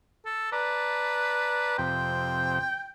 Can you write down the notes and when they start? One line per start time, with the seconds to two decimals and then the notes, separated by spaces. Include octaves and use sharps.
0.26 A4
0.52 B4 D5 A5 A#5
1.78 F2 C3 G5